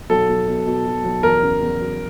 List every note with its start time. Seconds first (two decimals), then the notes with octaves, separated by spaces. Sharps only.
0.10 B1 A4
0.29 B1
0.47 B2
0.67 B2
0.86 B2
1.04 B1
1.23 E2 A#4
1.43 C#3
1.61 E2
1.80 F#3